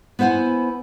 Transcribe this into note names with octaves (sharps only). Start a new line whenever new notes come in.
B3 E4 C5 F#5 G#5